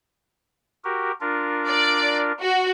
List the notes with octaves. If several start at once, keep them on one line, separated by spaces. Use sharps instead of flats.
F#4 G4 A#4
D4 F4 A#4
D5
F#4